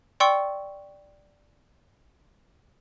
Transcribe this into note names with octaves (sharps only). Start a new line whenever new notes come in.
D5 G5 C6 C#6 E6 C#7